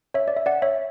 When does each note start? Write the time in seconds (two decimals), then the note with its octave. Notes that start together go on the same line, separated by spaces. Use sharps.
0.14 C#5 E5
0.28 D5
0.36 E5
0.46 D5 F#5
0.62 C#5 E5